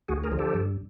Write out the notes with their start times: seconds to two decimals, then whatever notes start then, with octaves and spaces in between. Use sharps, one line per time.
0.08 D2 F#4 G#4
0.23 G#4 A#4
0.32 D3 F3
0.39 G4 A4
0.54 G2